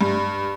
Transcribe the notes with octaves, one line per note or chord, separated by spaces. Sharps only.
G2